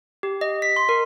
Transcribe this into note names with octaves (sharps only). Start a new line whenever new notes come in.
G4
D#5
B6
C6
A#4